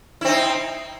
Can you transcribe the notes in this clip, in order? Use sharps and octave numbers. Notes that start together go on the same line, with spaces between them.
C4 D#4 E4